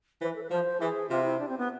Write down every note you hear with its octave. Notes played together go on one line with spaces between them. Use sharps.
E3 C5
B4
A4
B4
F3 C5
E3 G#4
C3 F4
E4
D4
C4
B3